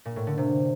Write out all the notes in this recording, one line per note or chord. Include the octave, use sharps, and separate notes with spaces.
A#2
A2
D3
C3